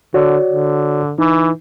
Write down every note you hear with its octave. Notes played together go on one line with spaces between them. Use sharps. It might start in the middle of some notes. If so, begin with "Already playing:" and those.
D3 F#4 C#5 D5
D3
E3 D#4